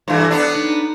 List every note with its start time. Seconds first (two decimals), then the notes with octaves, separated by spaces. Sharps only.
0.08 G2 E3 A4 C#5
0.31 B3 D4
0.55 D#4